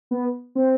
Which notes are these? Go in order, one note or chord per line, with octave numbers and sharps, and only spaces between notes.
B3
C4